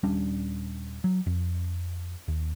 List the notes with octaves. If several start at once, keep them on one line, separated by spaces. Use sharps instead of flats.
D#1 G3 C#4 D4
F#3
F2
D#2